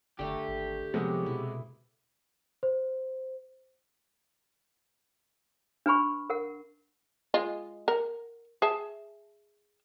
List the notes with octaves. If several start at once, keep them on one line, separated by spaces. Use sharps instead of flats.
F#1 D3 A3 G4 A#5
G#1
C3 F3 F#3 G#3 B3 F#4
B2 E4
C5
D4 B4 G#5 B5 C#6
A#4 F#5
G#3 F4 D#5
A#4 F#5
G#4 E5 A5